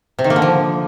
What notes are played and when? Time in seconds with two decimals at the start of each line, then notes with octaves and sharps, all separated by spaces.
0.19 C3
0.24 D#3
0.30 A#3
0.36 D3
0.42 F3